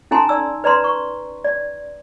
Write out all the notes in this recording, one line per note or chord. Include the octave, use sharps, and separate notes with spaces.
C#4 D#4 A4 G#5 A#5 C6
D5 E6
B4 D5 A#5 C6
C#6
D5